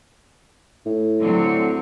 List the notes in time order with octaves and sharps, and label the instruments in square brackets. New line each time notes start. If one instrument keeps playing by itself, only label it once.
[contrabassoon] A2
[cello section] D3 F#3 C4